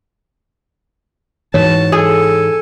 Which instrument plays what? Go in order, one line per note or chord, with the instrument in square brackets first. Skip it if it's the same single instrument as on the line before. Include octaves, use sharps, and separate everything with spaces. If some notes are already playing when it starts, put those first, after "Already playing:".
[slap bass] G#2 E3 [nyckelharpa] F#4 A5 [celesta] C#5
[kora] G#4 [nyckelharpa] A4 G#5